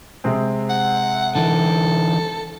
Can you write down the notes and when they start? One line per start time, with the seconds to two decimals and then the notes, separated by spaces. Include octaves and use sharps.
0.24 C3 G#3 C4
0.69 F#5
1.36 D3 E3 A4